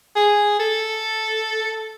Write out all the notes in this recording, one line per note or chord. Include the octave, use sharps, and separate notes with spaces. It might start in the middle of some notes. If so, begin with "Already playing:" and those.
G#4
A4